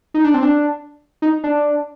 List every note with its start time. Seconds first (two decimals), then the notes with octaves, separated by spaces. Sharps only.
0.14 D#4
0.24 D4
0.34 C4
0.43 D4
1.22 D#4
1.44 D4